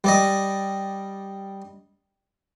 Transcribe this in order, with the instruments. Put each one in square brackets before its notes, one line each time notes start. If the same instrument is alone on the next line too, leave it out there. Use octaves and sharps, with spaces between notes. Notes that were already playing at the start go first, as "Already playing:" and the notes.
[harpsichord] G3 D5 D#5